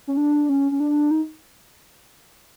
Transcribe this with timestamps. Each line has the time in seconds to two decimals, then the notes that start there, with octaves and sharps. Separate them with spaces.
0.07 C#4
0.17 D4
0.49 C#4
0.71 C#4
0.80 D4
1.11 D#4